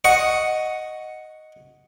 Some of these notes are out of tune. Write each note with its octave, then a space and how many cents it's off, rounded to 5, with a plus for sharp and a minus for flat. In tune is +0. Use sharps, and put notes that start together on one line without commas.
D#5 +0 F#5 -5 C#6 +5